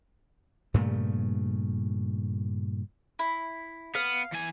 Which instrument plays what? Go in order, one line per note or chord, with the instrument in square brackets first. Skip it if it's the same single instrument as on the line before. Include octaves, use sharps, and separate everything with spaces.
[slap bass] G2 A#2 C#3 A3
[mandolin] E4
[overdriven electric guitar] B3 [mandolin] F5
[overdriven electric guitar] E2 G#5